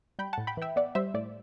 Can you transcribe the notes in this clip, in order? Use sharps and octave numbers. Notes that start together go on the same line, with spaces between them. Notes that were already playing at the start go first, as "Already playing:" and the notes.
G3 G5 B5
F#5 A5
A2
G5 B5
E3 E5 G5
B3 D5 F#5
G3 C5 E5
A2 D5